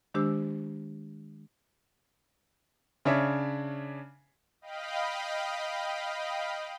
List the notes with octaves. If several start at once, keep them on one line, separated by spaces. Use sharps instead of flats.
D#3 G#3 D4 G4 C5 E6
C#3 D4 C#5 E5
D#5 F5 G5 B5